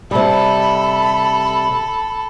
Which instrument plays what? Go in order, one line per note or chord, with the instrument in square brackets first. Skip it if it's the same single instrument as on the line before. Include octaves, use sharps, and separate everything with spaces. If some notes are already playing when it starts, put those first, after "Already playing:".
[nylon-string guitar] C3 G3 [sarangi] A4 [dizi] B5